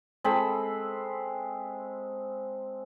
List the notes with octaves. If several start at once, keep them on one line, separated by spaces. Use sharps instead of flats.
G#3 C4 A4 B5